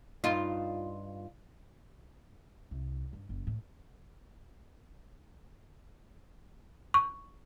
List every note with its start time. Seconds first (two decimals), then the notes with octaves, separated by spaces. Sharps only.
0.24 G2 D#4 F4
2.71 C2
3.13 G2
3.29 F#1
3.47 A2
6.94 C#6